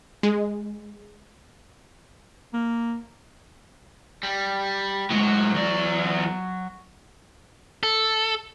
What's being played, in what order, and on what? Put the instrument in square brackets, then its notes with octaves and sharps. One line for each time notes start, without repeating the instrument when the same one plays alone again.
[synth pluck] G#3
[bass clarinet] A#3
[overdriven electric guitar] G3
[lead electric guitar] A2 G#3 [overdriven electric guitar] F#3
[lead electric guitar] E2 D5
A4